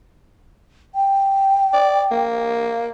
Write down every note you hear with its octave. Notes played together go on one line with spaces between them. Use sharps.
G5
D5
A#3